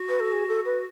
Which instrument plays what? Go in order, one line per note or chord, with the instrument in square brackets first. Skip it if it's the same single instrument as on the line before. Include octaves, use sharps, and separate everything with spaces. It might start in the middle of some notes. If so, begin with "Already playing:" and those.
Already playing: [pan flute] F#4
[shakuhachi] B4
A4
G#4
A4
B4